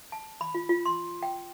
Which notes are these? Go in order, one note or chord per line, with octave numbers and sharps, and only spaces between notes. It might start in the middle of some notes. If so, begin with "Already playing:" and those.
A5
B5
F4
F4
C6
G5